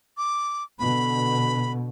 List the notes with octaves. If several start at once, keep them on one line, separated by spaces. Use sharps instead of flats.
D6
B2 D3 B5